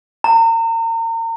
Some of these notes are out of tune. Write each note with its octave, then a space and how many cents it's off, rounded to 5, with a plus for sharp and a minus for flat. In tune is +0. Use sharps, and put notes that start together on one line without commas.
A#5 -35